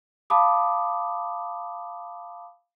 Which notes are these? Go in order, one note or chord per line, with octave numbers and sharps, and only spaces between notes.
F5 A5 B5 D6 D#6